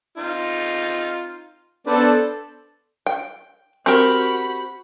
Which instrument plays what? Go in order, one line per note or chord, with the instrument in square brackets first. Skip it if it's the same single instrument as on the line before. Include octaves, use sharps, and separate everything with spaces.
[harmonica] C4 D#4 F4
[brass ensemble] B3 D4 A4 [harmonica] B4 C5 D5
[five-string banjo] G5
[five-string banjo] C4 G4 A#4 [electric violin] F#4 B5